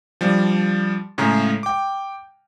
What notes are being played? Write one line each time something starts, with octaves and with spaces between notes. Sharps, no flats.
F3 G3 D4
A2 C#3 G#3 A#5
G5 D6